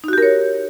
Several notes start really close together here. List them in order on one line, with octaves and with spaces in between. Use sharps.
D#4 F#4 G4 A#4 C#5